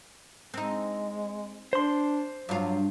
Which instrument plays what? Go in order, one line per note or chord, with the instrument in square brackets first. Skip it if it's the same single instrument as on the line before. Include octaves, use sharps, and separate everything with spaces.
[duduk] G#3 [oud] C4 D#4
[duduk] D4 [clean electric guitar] C5 C6
[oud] G2 F4 [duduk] F#3